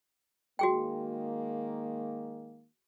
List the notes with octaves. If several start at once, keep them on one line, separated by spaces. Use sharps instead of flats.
D#3 G#3 A#3 F#4 G#4 G5